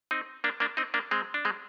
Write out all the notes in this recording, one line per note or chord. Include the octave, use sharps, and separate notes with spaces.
C4 D#4
A#3 D4
A#3 D4
C4 D#4
A#3 D4
G#3 C4
D4
G#3 C4